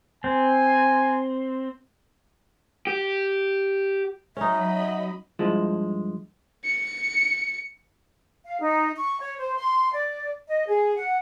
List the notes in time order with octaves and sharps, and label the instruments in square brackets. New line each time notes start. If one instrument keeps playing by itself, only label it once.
[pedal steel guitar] C4 [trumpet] G#5
[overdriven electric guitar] G4
[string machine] F#3 D#5 B5 [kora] C#4 D#4 [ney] E5
[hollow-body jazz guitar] G2 F3 G#3 E4
[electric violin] C#7
[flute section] F5
D#4
C#6
C#5
C5
C6
D5
D#5
G#4
F#5